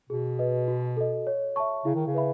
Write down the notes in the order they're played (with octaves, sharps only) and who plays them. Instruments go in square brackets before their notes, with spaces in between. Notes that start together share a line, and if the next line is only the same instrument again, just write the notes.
[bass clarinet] B2 [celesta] G#4
[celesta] B4 D#5
F#4
A4 D#5
C#5
E5 A5 C#6
[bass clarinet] C#3 [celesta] E4
[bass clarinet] D#3
C#3
[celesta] B4 E5 B5